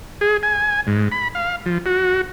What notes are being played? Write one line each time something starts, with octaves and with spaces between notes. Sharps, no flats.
G#4
G#5
G#2
B5
F5
F3
F#4